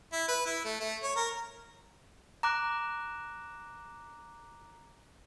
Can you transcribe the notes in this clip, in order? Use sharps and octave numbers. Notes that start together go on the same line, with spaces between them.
E4
B4
E4
A3
A3
C#5
A#4
A#5 D6 F#6